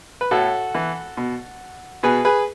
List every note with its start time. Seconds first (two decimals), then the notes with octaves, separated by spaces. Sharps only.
0.21 B4
0.31 A2 F#4 A4
0.75 E3
1.17 B2
2.03 B2 G#4 B4
2.25 G#4 B4